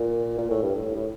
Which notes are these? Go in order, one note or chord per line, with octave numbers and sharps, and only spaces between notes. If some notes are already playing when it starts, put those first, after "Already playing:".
Already playing: A#2
A#2
A2
G2
A2
A2